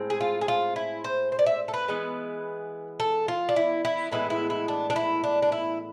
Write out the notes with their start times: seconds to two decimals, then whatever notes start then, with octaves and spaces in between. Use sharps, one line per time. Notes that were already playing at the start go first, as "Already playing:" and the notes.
Already playing: A2 G#3 C4
0.10 G#4
0.21 F4
0.41 G#4
0.48 F4
0.76 E4
1.04 C5
1.32 C5
1.39 D5
1.46 E5
1.68 A4
1.74 B4
1.88 E3 G#3 B3
3.00 A4
3.28 F4
3.49 D4
3.56 E4
3.85 E4
4.11 A2 E3 G#3 B3 E4
4.30 E4
4.50 E4
4.68 D4
4.90 D4
4.96 E4
5.24 D4
5.42 D4
5.52 E4